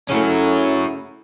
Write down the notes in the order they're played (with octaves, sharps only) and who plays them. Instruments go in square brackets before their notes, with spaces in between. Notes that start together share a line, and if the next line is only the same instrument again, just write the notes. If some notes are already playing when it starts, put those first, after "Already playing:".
[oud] C#3 A3 [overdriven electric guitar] C#4 F#4 [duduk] E4